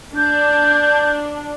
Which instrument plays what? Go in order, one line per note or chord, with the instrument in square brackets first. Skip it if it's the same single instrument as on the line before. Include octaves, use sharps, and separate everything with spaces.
[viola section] D4 [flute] G6